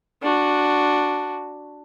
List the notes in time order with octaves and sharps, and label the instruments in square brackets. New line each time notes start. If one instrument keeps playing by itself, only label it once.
[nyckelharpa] D4 F#4